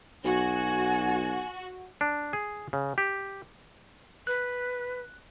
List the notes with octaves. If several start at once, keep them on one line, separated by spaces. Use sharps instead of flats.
B1 F#4 G#5
D4
G#4
C#3
G4
B4 F#6